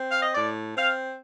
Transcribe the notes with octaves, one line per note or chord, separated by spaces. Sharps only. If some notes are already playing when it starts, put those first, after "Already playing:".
Already playing: C4
F5
D#5
A2 D5
C4 F5